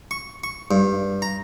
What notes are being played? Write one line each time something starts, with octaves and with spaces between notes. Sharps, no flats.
C#6
C#6
G2
A#5